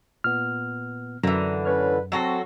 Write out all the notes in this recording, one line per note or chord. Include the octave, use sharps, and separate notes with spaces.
A#2 B3 F6
F#2 D3 E3 A#5
C#4 B4 C#5 F6
F#3 C4 F#4 A4 E6 A#6 C7